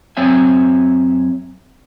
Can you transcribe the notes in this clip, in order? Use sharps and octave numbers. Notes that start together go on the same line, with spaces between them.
F#2 F#3 C4 C#5 E5 G#5